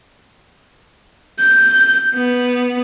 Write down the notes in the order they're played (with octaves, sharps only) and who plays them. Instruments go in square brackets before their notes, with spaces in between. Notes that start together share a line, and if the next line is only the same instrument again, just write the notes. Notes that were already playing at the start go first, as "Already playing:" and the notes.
[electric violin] G6
B3